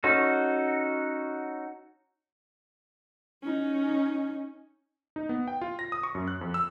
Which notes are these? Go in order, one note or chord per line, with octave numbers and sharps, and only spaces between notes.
C#4 D#4 F#4 A4
C#4 D#4
D#4
B3
G5
F4
A#6
D#6
C#6
F#2
F#6
F2
E6